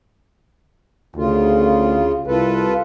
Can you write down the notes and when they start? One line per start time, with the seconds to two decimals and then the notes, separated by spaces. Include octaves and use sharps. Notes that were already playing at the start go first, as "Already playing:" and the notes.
1.16 D2 C#3 F4
2.27 C2 F4 A4 B4